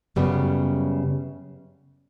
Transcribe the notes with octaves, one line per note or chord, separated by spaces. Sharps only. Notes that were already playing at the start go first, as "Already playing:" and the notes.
F#2 C#3 G3 B3